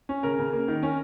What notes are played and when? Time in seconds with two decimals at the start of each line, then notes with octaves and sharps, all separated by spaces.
0.09 C#4
0.23 C#3 A#4
0.39 C#3
0.53 A#3
0.68 D#3
0.83 C#4